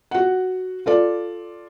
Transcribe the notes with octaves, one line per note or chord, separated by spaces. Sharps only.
F#4 F#5
F4 A4 D5